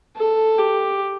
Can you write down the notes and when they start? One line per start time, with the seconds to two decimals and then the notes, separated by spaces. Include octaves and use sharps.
0.16 A4
0.58 G4